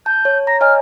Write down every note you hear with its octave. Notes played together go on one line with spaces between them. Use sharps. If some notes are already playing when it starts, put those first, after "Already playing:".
A5 G6
C#5
A#5 A#6
C#5 D#5 G#5 F6